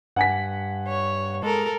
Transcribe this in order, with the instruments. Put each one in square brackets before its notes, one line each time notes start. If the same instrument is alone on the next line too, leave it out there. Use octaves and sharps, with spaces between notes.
[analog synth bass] G2 [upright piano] F#5 G#5 B6
[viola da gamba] C#5
[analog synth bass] G#3 [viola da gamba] A4 A#4